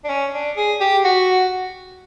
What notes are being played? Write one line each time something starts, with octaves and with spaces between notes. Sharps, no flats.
D4
C#4
D4
G#4
G4
F#4